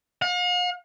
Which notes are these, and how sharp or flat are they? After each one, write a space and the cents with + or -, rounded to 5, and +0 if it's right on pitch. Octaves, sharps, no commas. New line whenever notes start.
F5 +45